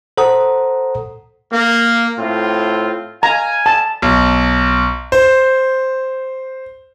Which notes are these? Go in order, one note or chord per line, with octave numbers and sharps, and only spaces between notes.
A4 C5 F#5 A#5 D#6
A#3
A2 C4 F4
F5 G#5 A#5
A5
B1
C5